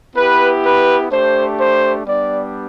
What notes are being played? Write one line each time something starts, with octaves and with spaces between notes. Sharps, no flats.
B3 E4 G4 B4
B4
A3 D4 G4 C5
C5
G3 B3 D4 G4 D5